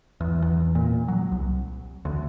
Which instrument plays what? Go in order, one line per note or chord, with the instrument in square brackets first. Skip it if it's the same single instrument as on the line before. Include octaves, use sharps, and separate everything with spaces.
[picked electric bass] E2
E2
A#2
F#3
C2
D2